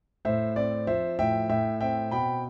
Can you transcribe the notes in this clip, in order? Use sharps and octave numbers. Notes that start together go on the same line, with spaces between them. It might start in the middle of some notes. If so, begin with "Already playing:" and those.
A2 C5 E5
C4 D5
F3 C5 E5
A2 E5 G5
A2 E5 G5
C4 E5 G5
B2 G5 B5